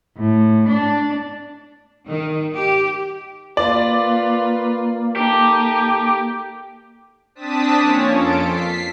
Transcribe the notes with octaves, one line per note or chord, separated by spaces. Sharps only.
A2
D4
D#3
G4
A#3 F4 B4 D5
D#4 G4 A4
C4 D4 A5 D#6 B6
F3 A#3 C#4 C#5
F2 F4 A4 A5 D7
B6 C7